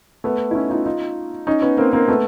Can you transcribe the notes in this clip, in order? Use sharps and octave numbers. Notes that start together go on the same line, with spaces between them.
A3 B3
E4
C#4 D#4
D#4 F4
D#4 F4
C#4 D#4
B3 C#4
A#3 C4
A#3 C4
A3 B3